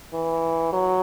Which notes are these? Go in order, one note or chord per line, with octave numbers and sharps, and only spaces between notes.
E3
F#3